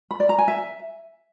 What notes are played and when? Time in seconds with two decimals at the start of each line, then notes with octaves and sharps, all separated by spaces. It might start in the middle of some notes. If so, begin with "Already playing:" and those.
0.11 B5
0.20 D5
0.29 A#5
0.38 G#5
0.48 E5